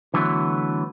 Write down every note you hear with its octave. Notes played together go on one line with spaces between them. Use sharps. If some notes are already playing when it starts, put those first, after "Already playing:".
D3 E3 F#3 A3 B3